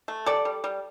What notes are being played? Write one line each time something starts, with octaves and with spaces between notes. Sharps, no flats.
A3
G3 A4 D5
G3
G3